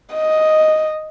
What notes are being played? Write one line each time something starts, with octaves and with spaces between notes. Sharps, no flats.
D#5